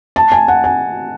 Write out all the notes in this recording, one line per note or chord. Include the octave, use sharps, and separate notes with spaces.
A5
G#5
F#5
G#5